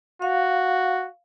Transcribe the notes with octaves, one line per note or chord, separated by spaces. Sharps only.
F#4 F5